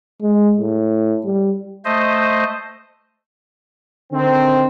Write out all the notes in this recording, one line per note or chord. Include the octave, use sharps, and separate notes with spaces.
G#3
A2
G3
A3 C5 D#5
D3 D#3 C4